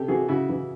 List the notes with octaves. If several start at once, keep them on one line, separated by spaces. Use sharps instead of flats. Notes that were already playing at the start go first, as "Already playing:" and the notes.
Already playing: C3 G4 A4
E3 F#4 G#4
C#3 E4 F#4
E3